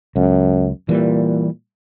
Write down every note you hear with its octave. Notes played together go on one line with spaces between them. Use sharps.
C#2 F#2
A#2 E3 G3